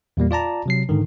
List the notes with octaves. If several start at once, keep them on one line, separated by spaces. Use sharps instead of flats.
E2 A#2 G3 A#3
F4 D5 A5 A#5
C3 F#3 C7
G#2 D3 D#3